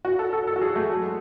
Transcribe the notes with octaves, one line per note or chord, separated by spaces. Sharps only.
F#4
A4
A4
A4
F#4
G#4
A3
F#3
G#3